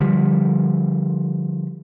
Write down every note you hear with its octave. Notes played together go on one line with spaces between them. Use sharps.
D3 F3 G3